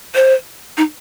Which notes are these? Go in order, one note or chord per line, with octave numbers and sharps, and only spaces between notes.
C5
D#4